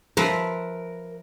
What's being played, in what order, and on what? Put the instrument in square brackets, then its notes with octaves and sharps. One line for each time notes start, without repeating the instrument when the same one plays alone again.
[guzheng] F3 B4 E5 [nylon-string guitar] A#4